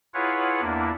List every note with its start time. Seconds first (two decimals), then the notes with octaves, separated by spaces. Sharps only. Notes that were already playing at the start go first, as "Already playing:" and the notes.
0.14 E4 F4 G#4 B4 C#5 F#5
0.61 E2 A#3 D4 E4